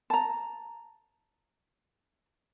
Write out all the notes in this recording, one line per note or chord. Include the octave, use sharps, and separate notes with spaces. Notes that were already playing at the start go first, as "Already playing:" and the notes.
A5 A#5